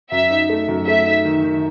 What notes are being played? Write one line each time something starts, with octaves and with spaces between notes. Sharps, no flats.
F#2 E5
D#4
A3
F#2
A3 E5
D#4
D#3
D#3